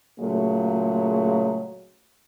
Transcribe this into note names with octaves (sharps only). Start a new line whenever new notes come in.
A#2 C#3 F#3 G#3 A3